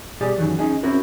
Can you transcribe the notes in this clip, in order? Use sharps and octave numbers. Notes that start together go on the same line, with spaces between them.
B2 G3 G4 G#4 D5
F#2 D#3 E3 F#3
C#4 D#4 G#4
C4 C#4 E4 F#4 A#4